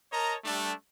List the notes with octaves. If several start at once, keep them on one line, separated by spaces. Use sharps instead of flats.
A#4 C#5 D#5 A5 A#5
G3 A3 D4